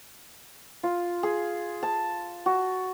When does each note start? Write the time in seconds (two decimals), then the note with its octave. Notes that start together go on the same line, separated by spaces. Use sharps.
0.83 F4
1.23 G#4
1.83 A5
2.46 F#4